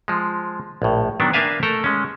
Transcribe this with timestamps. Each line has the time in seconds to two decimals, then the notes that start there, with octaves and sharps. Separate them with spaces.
0.08 F3 G#3
0.82 A#1 A2
1.20 D#3 F#3 B3 D4
1.33 A#3 D4 B4 E5 F5 G#5
1.63 A3 A4 A#4 A#5
1.84 G#3 C#4